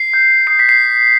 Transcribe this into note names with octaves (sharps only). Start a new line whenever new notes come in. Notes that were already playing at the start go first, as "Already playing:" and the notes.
Already playing: C7
G6
D#6 C7
B6
C7